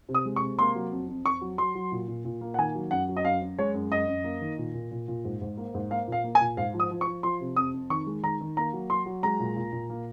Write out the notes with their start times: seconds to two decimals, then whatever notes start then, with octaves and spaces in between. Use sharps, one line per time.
0.09 C3
0.14 D#6
0.25 G#3
0.36 C#6
0.42 C3
0.58 A#3 C6
0.75 F#3
0.92 F2
1.08 F2
1.25 F2 C#6
1.41 F#3
1.58 F#3 C6
1.75 F#3
1.92 A#2
2.08 A#2
2.25 A#2
2.41 A#3
2.54 F#5
2.58 D#3 G#5
2.75 F#3
2.91 F#2 F#5
3.08 F#3
3.17 D#5
3.25 F#2 F5
3.42 F#2
3.59 G#3 C#5
3.74 F#2
3.91 F#2 D#5
4.08 F#2
4.24 A#3
4.41 D#3
4.58 A#2
4.74 A#2
4.92 A#2
5.08 A#2
5.25 G#2
5.41 G#2
5.57 A#3
5.74 G#2
5.91 A#3 F5
6.07 A#2 F5
6.24 A#3
6.35 G#5
6.41 A#2
6.57 G#2 F5
6.74 F3
6.80 D#6
6.91 F3
7.01 C#6
7.07 F3
7.23 F3 C6
7.41 C3
7.56 F2 D#6
7.73 F2
7.90 D#3 C#6
8.07 G#3
8.23 D#3 A#5
8.41 D#3
8.57 A#3 A#5
8.73 F#3
8.90 F#3 C6
9.06 F#3
9.23 G#3 A#5
9.40 A#2
9.56 A#2
9.72 A#2
9.90 A#3